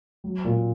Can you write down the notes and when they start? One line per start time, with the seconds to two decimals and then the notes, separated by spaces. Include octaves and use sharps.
0.24 F#3
0.45 A#2